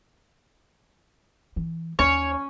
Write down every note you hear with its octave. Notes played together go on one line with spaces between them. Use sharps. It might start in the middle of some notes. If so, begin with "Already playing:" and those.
E3
D#2 C#4 C#5 G#5